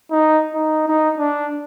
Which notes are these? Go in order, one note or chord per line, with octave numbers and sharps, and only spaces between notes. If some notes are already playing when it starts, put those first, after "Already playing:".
D#4
D#4
D#4
D4